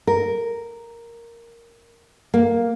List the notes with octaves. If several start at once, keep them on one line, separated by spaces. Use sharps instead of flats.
A#4
A#3